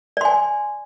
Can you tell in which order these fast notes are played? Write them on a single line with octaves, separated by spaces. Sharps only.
D5 C6 G#5